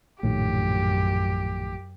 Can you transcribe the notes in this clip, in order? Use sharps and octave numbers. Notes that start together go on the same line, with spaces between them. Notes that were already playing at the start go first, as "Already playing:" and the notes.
A#1 F#2 A2 D#3 G4